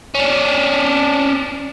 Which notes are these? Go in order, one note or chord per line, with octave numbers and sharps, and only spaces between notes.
C#4 D4